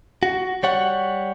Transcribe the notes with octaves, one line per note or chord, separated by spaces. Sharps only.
F#4
G3 C#5 F#5